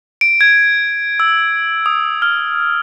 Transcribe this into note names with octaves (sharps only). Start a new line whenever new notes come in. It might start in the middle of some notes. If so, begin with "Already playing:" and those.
D7
G#6
E6
D#6
F6